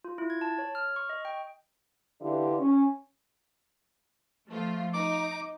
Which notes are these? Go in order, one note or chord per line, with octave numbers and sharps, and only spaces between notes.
F4
E4
G#6
A5
C#5
F6
C#6
D#5
G5
D3 E3 D4 E4 F4 G4
C#4
F3 A3 F4
D#4 D6